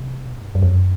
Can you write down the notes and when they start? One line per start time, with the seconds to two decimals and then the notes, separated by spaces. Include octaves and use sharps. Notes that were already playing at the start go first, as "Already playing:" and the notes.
Already playing: C3
0.25 B2
0.41 G2
0.55 F#2
0.62 F2
0.70 F#2